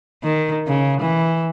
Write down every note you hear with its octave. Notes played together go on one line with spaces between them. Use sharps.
D#3
C#3
E3